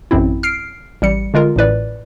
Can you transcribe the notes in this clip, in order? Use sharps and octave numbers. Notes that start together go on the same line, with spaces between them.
A1 F#2 C4 E4
F6 C7 D7
A1 G3 C#7
D3 G#3 F4 A#4
A1 A2 B4 D5